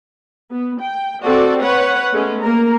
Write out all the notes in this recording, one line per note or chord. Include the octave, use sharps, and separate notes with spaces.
B3
G5
C4 F#4 A4 D5
B4 C#5 F#5
G#3 A3 B3 C#4 G#4
A#3 A#4 A#5